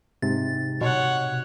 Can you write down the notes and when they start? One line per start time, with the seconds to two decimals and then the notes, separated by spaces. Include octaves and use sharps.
0.22 G#2 C3 A6
0.81 B2 C#5 F#5